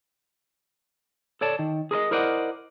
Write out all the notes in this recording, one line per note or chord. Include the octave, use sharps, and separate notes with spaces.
A4 C#5 D5 A5
D#3
G#4 A#4 B4 D#5
E4 A#4 C5 D5 D#5 F#5